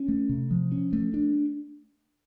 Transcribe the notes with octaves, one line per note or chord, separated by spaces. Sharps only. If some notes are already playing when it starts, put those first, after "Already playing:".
Already playing: C#4
A3
C3
F3
C#4
A3
D4